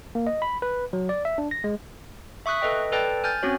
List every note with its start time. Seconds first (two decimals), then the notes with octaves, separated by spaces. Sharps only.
0.15 A#3
0.27 D#5
0.42 B5
0.62 B4
0.93 F#3
1.09 D5
1.25 E5
1.38 D4
1.51 A#6
1.64 G#3
2.46 E5 C#6 D#6 F#6 B6
2.62 A4 B4 D#5 G5
2.92 A4 B4 D5 G5 A5
3.24 G#5 F6 G6 A6
3.43 C4 C#4 F#4 C#5